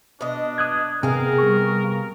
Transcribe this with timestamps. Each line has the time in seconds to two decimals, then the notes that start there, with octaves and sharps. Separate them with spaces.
0.21 B2 D4 D#5
0.58 D#6 F#6 G#6
1.03 C3 B3 G#4 A#4 F5
1.38 G3 C#6